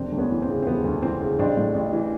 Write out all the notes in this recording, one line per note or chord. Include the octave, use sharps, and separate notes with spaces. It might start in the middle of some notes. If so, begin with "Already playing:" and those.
Already playing: E1 C4 D4
D2
B3 C#4
E3
C4
C#3
C4
E1 B3
D2
E3 C4
C#3
A1 C4 D4
A2
A1
E3